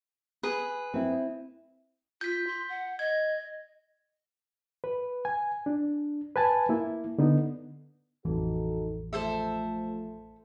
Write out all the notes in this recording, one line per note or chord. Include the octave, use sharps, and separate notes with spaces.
G#4 B4
C4 E4
F4 G6 B6
C6
F#5
D#5 G#6
B4
G#5
D4
B4 G#5 A5
A#3 E4
D3 B3 D#4
A1 F2 E3 D#4 F#4 A4
F3 A3 A4 C5 E5